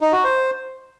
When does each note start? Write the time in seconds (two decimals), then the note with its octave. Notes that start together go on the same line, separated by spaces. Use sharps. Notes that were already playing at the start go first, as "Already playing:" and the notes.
0.01 D#4
0.13 F#4
0.24 C5